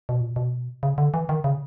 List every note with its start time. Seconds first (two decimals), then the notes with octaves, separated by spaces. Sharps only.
0.09 B2
0.21 A#2
0.36 B2
0.83 C#3
0.98 D3
1.14 E3
1.29 D#3
1.44 C#3